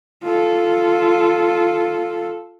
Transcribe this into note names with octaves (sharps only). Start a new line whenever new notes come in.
F4 A4